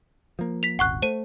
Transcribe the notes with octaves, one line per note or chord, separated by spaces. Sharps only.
F3 A#3
B6 F7
D#1 G#1 F#5 C#6 F#6
A3 C5 D#7